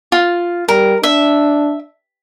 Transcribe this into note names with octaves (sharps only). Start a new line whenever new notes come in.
F4
G3 A#4
D4 E5